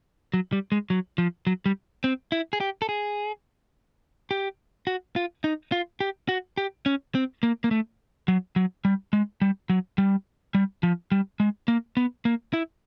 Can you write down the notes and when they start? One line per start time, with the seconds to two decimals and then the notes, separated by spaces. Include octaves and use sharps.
0.34 F#3
0.53 G3
0.72 G#3
0.90 F#3
1.18 F3
1.47 F#3
1.66 G3
2.04 C4
2.32 E4
2.53 G#4
2.60 G4
2.82 A4
2.89 G#4
4.31 G4
4.87 F#4
5.16 F4
5.44 D#4
5.72 F4
6.01 G4
6.29 F#4
6.58 G4
6.86 C#4
7.15 C4
7.43 A#3
7.64 A#3
7.71 A3
8.28 F#3
8.56 F#3
8.85 G3
9.13 G#3
9.42 G3
9.70 F#3
9.98 G3
10.55 G3
10.83 F3
11.12 G3
11.40 G#3
11.68 A#3
11.97 B3
12.25 A#3
12.54 E4